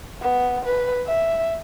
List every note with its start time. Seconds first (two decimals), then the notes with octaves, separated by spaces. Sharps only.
0.22 B3
0.65 B4
1.07 E5